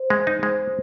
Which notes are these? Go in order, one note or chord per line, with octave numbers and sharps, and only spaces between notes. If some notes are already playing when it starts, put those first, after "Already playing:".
Already playing: C5
G#3
D#4
G#3 C5